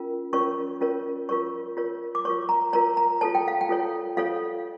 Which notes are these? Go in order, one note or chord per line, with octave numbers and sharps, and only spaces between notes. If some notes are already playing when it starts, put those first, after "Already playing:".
Already playing: C#4 F4 A#4
C#4 F4 A#4 C#5 C#6
C#4 F4 A#4 C#5
F4 A#4 C#5 C#6
F4 A#4 C#5
D6
F4 A#4 C#5 C#6
A#5
F4 A#4 C#5 A#5
A#5
F4 A4 C#5 A5
G5
F5
G5
F4 A4 C#5
F4 A4 C#5 F5